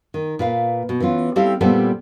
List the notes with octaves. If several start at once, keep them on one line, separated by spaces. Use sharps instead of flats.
D#3
A#2 B4 F5
B2
E3 B3 C#4 F4
G3 C4 E4 G4 A4 F5
A#2 G3 B3 C4 A4